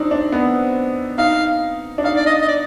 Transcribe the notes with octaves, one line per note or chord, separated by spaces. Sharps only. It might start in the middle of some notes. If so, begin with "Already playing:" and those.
Already playing: C4 D4 D#4
D4
B3
D#4 F5
D4
D#4 F5
D5
D#5
D#5
D5